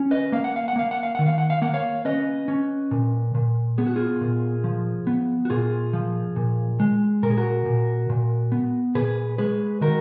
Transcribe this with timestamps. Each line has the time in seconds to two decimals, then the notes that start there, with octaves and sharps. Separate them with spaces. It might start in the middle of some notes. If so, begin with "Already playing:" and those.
Already playing: C#4
0.11 B4 D#5
0.32 A#3 F5
0.44 F#5
0.56 F5
0.68 F#5
0.76 A#3 F5
0.91 F#5
1.03 F5
1.15 D#3 F#5
1.26 F5
1.38 F#5
1.50 F5
1.62 A#3 F#5
1.74 C#5 F5
2.05 C#4 B4 D#5
2.48 C#4
2.91 A#2
3.35 A#2
3.78 B3 G#4
3.87 F#4
3.96 F4 G#4
4.21 A#2
4.64 F3
5.07 B3
5.45 F#4
5.50 A#2 F4 G#4
5.93 F3
6.36 A#2
6.80 G#3
7.23 A#2 A#4
7.30 G#4
7.37 F#4 A#4
7.66 A#2
8.10 A#2
8.52 B3
8.95 A#2 G#4 B4
9.38 G#3 G#4 B4
9.81 D#3 F#4 A#4